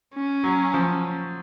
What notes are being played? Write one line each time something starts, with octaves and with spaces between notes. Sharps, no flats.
C#4
F#3
F3